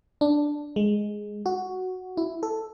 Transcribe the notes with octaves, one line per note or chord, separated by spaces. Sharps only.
D4
G#3
F#4
E4
A4